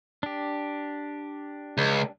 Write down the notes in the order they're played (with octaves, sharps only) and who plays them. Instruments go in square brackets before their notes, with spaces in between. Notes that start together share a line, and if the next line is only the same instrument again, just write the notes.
[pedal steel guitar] D4 G4
[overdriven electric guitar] C#2